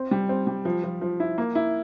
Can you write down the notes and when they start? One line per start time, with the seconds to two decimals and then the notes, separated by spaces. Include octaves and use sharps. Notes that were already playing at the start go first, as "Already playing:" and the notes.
Already playing: C4
0.11 G3
0.29 C4
0.47 G3
0.65 F3
0.84 F3
1.01 F3
1.20 E4
1.38 A#3
1.55 E4